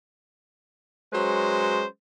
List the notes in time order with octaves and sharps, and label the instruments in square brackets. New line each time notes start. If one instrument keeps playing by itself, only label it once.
[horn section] F#3 G#3 C#4 B4 C5